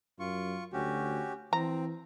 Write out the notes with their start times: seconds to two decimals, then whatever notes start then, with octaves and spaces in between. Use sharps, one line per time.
0.19 F#2 F4 C#6
0.73 D2 C#4 F#4 G4
1.53 E3 C4 A#5